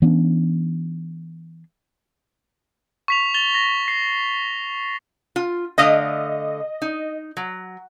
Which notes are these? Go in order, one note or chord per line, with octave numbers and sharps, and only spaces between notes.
E3 B3 C#4 D4
C#6 B6 F7
A6 F7 G7
A#6
C7
F4
D3 A3 D#5 F5
D#4
F#3